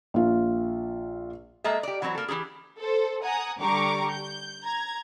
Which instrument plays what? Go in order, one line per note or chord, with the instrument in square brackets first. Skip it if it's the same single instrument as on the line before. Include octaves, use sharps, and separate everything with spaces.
[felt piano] A#1 F4
[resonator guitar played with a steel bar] G#3 A#3 A4 D#5 E5
G4 D5
E3 F#3 C4 D#4 E4
A#3 A4
E3 E4 G4 G#4
[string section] A4 C5
F#5 G#5 A#5 D#6
D3 G3 G4 A#5 C#6 D6
G6
A#5 G#6